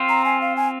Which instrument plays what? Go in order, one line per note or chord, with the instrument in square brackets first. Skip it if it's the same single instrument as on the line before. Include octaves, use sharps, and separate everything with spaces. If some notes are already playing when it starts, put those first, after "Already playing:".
Already playing: [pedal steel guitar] C4 F4
[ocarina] A#5
G#5
F5
G#5